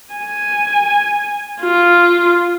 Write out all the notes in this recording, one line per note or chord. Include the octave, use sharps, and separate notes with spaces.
G#5
F4